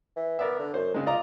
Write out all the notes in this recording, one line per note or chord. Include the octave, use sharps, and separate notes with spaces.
E3
B3 A#4 D5 E5
D3
F#2 C5
C#3 G#3 D#4
F4 D5 D#5 A#5